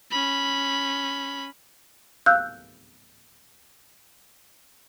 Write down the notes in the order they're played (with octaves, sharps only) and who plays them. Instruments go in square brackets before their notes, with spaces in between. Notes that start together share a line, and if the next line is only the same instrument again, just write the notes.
[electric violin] C#4 B5
[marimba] F5 E6 F#6 G6